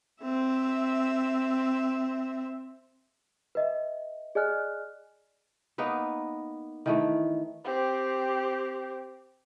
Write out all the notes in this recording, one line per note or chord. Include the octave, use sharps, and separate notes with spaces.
C4 E5
B4 D#5 E5
G#4 D5 D#5 G#5 F6 F#6
A#3 B3 D#4 B4
D#3 E3 A3
C4 G4